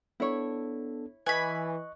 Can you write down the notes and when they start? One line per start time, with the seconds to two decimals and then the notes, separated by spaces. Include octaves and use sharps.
0.20 B3 D4 E4 A4 C#5
1.26 E3 D#5 G#5 B5 C#6 F#6